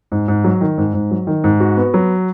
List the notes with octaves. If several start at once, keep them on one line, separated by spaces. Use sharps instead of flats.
G#2
G#2
F#3
D#3
G#2
G#2
F#3
D#3
G#2
F#4
B3
F#3